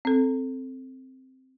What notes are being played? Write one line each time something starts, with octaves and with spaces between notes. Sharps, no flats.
C4 A4